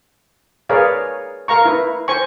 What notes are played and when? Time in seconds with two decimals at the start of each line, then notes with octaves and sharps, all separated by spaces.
0.69 G#4 A#4 B4 C#5 D5 F5
1.48 A#4 F5 A#5 C#6
1.65 E4 B4
2.08 C5 G#5 C#6